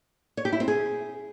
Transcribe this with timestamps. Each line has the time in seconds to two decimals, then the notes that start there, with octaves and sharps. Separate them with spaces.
0.37 C#5
0.45 G4
0.53 E4
0.60 C4
0.68 G#4